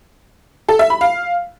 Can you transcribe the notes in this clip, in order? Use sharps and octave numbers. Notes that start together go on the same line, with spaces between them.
A4
E5
B5
F5